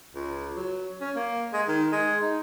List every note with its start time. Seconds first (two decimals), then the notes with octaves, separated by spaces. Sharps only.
0.15 C#2
0.57 F#3
1.01 C#4
1.16 A#3
1.53 G#3
1.68 D#3
1.92 G#3
2.22 D#4